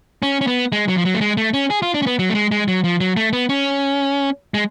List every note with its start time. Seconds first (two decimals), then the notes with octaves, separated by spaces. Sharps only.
0.23 C#4
0.41 C#4
0.47 B3
0.72 G#3
0.88 F#3
0.98 F3
1.05 F#3
1.14 A3
1.21 G#3
1.37 A3
1.54 C#4
1.70 G#4
1.82 F4
1.94 D4
2.02 C#4
2.06 B3
2.19 F#3
2.29 A3
2.35 G#3
2.51 G#3
2.68 F#3
2.84 F3
3.00 F#3
3.16 A3
3.33 B3
3.49 C#4
4.54 G#3